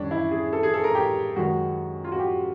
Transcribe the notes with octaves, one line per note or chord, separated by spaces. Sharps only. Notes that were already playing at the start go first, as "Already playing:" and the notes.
Already playing: F#2 D#3 G3 C#4 D4
E4
G#4
A4
G#4
A4
A#4
G4
F#2 D#3 G#3 F#4
F4
F#4
G4